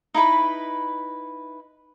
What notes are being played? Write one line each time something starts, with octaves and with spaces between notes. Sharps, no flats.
D#4 E4 B4 B5